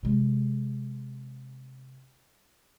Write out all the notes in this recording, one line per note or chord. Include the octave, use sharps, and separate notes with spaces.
C3 G#3